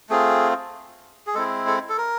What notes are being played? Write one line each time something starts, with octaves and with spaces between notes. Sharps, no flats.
A3 C4 F4 G#4
G#4
G#3 C4 E4 A4
A4
A4
A#4